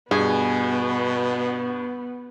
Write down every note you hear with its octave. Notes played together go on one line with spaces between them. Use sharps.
G2 B2 B3 G#4